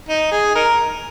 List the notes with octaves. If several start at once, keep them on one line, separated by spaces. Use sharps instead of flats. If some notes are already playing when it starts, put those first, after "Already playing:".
D#4
G#4
D#4 A#4